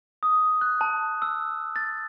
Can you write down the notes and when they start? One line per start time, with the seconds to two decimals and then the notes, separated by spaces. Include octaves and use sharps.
0.23 D#6
0.61 F#6
0.81 A5
1.22 E6
1.76 A6